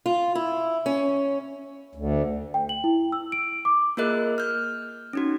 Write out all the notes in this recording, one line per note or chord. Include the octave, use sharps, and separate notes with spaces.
F4
E4
C#4
D2
G5
F#7
E4
E6
D7
D6
A#3 F4 G#4 A#4 D#5 F#6
F6 G6
C#4 D#4 F#4